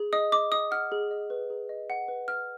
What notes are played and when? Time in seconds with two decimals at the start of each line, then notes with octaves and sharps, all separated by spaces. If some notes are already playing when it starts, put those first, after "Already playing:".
Already playing: G#4
0.13 D#5 D#6
0.32 D#5 D6
0.52 D#5 D#6
0.71 F#5 F6
0.92 G#4
1.11 D#5
1.30 B4
1.50 G#4
1.69 D#5
1.90 F#5
2.08 B4
2.28 F#5 F6